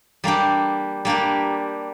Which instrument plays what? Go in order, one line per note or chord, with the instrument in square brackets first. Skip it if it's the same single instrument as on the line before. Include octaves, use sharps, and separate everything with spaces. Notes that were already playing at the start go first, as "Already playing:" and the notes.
[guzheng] G3 A#3 D4 G4
G3 A#3 D4 G4